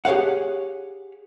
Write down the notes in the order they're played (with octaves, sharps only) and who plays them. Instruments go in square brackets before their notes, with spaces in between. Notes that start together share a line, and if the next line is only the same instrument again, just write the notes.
[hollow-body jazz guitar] G4 G#4 C#5 F5 F#5